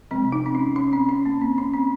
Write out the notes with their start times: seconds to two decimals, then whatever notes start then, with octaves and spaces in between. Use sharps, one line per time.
0.11 C3 F3 G#3 C4
0.32 D#4
0.46 C4
0.55 C#4
0.76 C#4
0.93 C4
1.09 C#4
1.26 A#3
1.41 C4
1.58 C#4
1.73 C4